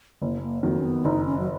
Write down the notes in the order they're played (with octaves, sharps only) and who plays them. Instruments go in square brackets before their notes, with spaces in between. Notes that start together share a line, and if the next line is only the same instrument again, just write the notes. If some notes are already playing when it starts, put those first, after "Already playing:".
[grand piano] F#1 [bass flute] A#3
[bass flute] A#3
[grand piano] F2 D#3 F#3 [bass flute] A#3
[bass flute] C#4
B3
[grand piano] F#1 [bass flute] D#4
[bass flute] C#4
F#3